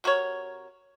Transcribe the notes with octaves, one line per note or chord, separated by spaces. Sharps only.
C3 F#4 A#4 C#5